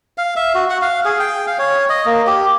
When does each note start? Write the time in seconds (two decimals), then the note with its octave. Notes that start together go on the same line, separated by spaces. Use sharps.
0.18 F5
0.36 E5
0.55 F#4
0.70 F#5
0.82 F5
1.05 G#4
1.20 G5
1.47 F5
1.59 C#5
1.89 D#5
2.06 A#3
2.27 G4